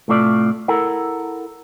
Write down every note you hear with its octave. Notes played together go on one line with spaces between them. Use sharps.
A2 C3 A3 F4 D5
E4 A4 A#4 F#5